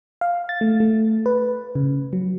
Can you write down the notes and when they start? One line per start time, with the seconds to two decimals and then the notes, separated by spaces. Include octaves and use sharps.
0.21 F5
0.49 A6
0.61 A3
0.80 A3
1.26 B4
1.75 C#3
2.13 F#3